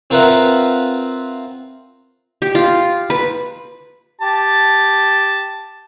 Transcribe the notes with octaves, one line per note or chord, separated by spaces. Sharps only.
C4 F4 A#4 B4 E5 F#5
G4
F4
B4
G4 A5